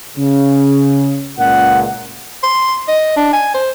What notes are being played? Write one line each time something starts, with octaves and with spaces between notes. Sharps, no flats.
C#3
C#2 A#2 F#5
C6
D#5
D4
G#5
C5